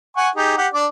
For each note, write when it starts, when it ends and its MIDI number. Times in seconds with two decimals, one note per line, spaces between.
0.17 0.29 78
0.17 0.29 80
0.17 0.29 85
0.36 0.57 63
0.36 0.57 67
0.36 0.57 68
0.58 0.67 67
0.58 0.67 78
0.74 0.87 62
0.74 0.87 74
0.74 0.87 86